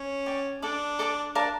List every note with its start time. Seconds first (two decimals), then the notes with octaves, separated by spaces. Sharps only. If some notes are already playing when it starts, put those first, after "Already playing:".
Already playing: C#4
0.26 D5 G5 C#6
0.62 D4 A4 D5 A5 D6
0.99 A4 D5 A5 D6
1.35 D4 A#4 D5 F5 A5